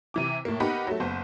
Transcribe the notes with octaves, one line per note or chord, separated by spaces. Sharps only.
C3 E3 D6
A2 A#3
B3 D#4 G4 A#4 F#5 B5
F#3 A3
F#1 B3 C5